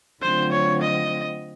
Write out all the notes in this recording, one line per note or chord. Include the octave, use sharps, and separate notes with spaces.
D3 F#3 A3 C4 F4 C5
C#5
D#5